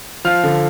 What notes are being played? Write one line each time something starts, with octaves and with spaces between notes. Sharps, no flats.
F3 F5 F6
D3